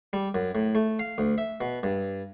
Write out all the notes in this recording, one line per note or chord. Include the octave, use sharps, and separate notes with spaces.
G3
F#2
A2
A3
F5
D2
E5
B2
G2